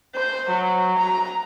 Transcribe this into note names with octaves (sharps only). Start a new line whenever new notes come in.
C5
F#3
A#5